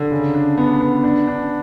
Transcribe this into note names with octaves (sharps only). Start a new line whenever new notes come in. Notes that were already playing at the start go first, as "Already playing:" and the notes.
Already playing: D3
C#3
D4
B3
B3
D4
D4